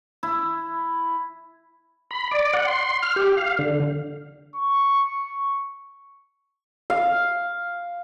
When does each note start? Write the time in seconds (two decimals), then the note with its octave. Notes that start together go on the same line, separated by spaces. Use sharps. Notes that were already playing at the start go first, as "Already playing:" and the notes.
0.23 E4
2.11 B5
2.31 D5
2.54 F#5
2.67 C6
3.03 F6
3.16 G4
3.37 F5
3.59 D3
4.56 C#6
6.90 F5